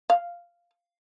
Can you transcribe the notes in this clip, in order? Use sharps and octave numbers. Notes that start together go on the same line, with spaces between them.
F5